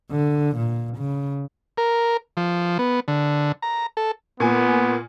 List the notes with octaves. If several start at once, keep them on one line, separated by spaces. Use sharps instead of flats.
D3
A#2
C#3
A#4
F3
B3
D3
A#5
A4
A#2 B3 G#5